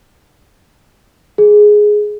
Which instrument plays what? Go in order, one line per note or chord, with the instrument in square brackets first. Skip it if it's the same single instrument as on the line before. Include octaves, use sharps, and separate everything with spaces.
[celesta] G#4